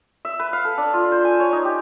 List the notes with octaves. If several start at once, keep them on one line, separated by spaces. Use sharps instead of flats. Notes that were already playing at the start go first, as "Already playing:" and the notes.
E5
B4
F5
A4
D4
F4
C5
G#5
C#5
D#4
G4